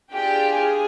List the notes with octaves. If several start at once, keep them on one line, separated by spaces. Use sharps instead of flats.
D4 F4 G4 G#4 G5
G#4 G#5